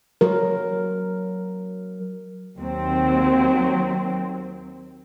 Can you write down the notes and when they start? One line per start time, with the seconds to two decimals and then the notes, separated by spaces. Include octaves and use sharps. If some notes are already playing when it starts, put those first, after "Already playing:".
0.21 F#3 A#4
2.58 D#2 F#3 C4